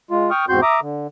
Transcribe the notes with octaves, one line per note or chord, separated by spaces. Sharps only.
G#3 F4
G5 C#6 D#6 F6
E2 G#2 C4 F#4 C6 G6
E5 A#5 D6 D#6
D3